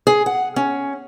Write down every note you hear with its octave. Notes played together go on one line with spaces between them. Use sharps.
G#4
F#5
C#4